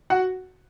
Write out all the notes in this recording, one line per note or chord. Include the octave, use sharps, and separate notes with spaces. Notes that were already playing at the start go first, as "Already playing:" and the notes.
F#4 F#5